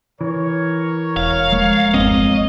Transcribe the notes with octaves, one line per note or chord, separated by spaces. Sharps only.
E3 A#4 C#5
E1 F5
F3 G#3 A#3
G1 E2 C4 D#5